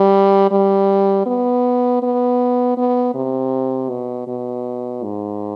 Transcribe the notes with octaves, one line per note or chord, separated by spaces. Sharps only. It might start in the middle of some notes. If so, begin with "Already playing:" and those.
Already playing: G3
G3
B3
B3
B3
C3
B2
B2
G#2